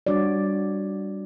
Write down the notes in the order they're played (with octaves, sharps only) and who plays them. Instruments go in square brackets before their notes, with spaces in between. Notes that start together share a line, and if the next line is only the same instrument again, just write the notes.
[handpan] G3 D4 F#4 C#5 D5